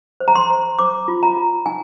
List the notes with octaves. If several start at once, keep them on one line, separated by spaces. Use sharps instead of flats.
C5
A#5
C6
C5
C5 D6
F4
A#5
F4
D#4 G#5